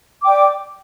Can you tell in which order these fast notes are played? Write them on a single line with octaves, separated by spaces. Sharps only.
D6 G5 D5